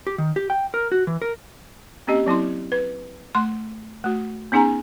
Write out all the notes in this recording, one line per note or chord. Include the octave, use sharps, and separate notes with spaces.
G4
D#3
G4
G5
A#4
F#4
E3
A#4
A#3 C4 C#4 G4 D#5
F#3 C4 E4 C6
B4
A3 C6
A3 F#4
B3 C#4 D#4 G#4 G#5 A#5